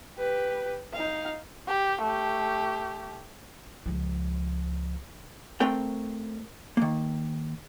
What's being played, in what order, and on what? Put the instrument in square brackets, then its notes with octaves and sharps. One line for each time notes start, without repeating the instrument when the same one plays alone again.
[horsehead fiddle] G4 B4
D#4 F5
[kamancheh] G4
A3 G4
[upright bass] C#2 F3
[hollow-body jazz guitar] A3 C4 A#4 G5
D#3 A#3